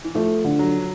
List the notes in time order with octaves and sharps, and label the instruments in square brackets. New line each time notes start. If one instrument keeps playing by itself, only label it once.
[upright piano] E3
[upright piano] F3 [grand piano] A3
[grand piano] D3
[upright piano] F#3